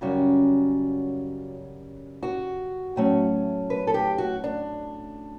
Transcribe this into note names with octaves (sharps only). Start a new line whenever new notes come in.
F#2 C#3 G3 C#4 F#4
F#4
A2 F#3 A3 C#4
B4
A4
G4
F#4
D4